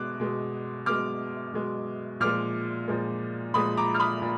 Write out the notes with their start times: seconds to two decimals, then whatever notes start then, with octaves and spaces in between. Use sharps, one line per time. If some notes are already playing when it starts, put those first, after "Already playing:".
Already playing: B2 G#3 D6 F#6
0.20 B2 G#3
0.86 B2 G#3 D6 F6
1.54 B2 G#3
2.20 A#2 F3 G#3 D6 F6
2.88 A#2 F3 G#3
3.54 A#2 F3 G#3 B5 D#6
3.77 A#5 D6
3.94 F6
4.00 B5 D#6
4.22 A#2